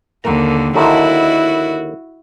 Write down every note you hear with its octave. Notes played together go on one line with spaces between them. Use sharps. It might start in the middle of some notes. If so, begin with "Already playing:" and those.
D#2 D3 A#4 A#5
D#2 D3 D#3 E4 F#4